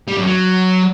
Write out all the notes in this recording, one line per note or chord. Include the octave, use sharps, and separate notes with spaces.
G3
F#2
F#3